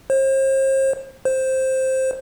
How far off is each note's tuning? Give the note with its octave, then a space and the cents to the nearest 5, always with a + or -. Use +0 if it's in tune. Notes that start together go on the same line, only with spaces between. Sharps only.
C5 +40
C5 +5